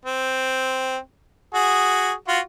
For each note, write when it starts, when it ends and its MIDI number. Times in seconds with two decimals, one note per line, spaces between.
0.05 0.97 60
1.54 2.12 66
1.54 2.12 68
2.28 2.40 65
2.28 2.40 66